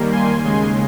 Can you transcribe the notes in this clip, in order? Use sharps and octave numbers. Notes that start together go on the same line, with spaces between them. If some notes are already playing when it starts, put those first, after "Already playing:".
Already playing: D#2 D#3 G3 A#3
G#5 C6
D#2 C#3 G#3 G#5 C6